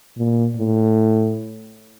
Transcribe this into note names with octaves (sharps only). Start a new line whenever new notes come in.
A#2
A2